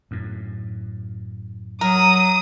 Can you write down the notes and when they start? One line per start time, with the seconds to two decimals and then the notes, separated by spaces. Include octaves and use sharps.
0.11 F#2 A2
1.81 F#3 A#4 D#6